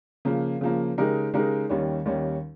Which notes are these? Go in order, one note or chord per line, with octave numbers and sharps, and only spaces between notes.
C#3 F3 A#3
C#3 F3 A#3
C#3 G#3 D#4 G4 A#4
C#3 G#3 D#4 G4 A#4
D#2 D#3 G3 C#4
D#2 D#3 G3 C#4